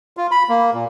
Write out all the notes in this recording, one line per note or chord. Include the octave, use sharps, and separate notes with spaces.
F4
B5
A#3
A#2